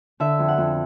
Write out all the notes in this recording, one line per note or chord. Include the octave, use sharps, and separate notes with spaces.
D3 E5
F2
F#5
F2